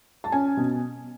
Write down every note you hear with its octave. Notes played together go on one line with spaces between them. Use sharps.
A5
C#4 G#5
B2